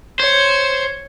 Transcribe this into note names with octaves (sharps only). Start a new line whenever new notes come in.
C5 C#5